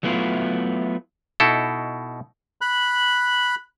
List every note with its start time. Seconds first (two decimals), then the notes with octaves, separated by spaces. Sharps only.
0.03 F#3 A3 B3 E4 F4
1.40 B2 D#4 E4 A4
2.61 B5 F#6